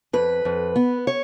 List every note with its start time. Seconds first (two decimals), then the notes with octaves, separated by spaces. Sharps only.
0.13 F2 B4
0.45 F2
0.76 B3
1.07 C#5